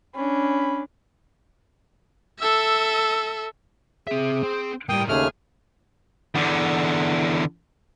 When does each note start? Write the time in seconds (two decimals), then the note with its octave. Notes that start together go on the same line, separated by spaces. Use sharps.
0.16 C#4 D4 B5
2.40 A4 E5
4.08 C4 G#4 E5
4.43 C4 C5
4.89 A2 G3 A#3 G5 D#6
5.09 D#2 C#3 A3 G#4 F6
6.35 E2 D3